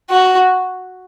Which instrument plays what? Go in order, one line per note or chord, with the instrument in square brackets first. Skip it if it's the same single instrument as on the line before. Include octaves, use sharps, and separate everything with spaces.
[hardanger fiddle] F#4